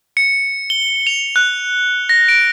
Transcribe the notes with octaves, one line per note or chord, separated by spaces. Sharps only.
C#7
G7
F7
F#6
A#6
D7